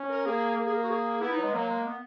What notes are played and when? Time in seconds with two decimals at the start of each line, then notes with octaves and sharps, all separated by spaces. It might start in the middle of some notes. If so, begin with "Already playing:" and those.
Already playing: C#4
0.10 A#4
0.26 A#3 G#4
0.57 A#3
0.66 G#4
0.73 A#4
0.83 F#4
0.90 G#4
1.21 B3 E4
1.32 D#4
1.37 F#3
1.42 G#3
1.53 F#3 A#3
1.69 G#3
1.85 B3